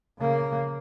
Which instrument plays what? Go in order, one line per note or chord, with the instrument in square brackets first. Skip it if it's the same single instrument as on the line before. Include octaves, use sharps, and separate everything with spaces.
[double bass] C#3 A#3